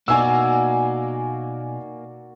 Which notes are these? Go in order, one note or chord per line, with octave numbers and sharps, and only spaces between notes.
B2 A#3 D#4 F#4 D5 G#5 E6